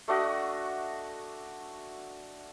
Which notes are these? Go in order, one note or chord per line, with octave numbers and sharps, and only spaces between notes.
A3 D4 F#4 D#5